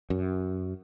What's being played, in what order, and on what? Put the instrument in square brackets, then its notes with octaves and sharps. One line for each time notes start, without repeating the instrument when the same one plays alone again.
[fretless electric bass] F#2